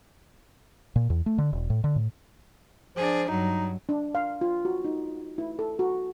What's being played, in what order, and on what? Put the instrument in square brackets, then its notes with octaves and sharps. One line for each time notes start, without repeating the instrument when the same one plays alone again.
[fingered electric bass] A#2
E2
A3
D3
E1
A2
D3
A2
[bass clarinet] F3 [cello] D4 G#4
[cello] G2 F#3 [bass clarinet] D#4
[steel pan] D4
F5
F4
F#4
D#4
E4
A4
F#4